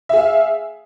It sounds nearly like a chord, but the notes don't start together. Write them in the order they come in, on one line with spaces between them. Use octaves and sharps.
E5 G#4 F5